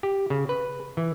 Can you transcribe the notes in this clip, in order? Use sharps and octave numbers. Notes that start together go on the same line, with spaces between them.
G4
C#3
B4
E3